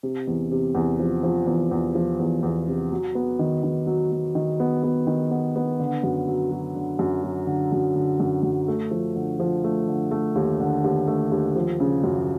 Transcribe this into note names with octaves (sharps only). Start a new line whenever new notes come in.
C3
E2
C3
E2
F3
F3
E2
E2
F3
E2
E2
C3
F#3
B3
D#3
D#3
F#3
F#3
D#3
B3
B3
D#3
B3
B3
D3
F#2
F#3
F#3
D3
F#2
F#3
D3
F#2
D3
F#2
F#2
A3
F3
D3
F3
A3
D3
A3
D#2
D3
D#2
A3
D#2
F3
C#3
F#2